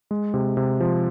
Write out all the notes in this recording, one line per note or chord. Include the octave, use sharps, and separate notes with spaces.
G#3
C3
C3
F3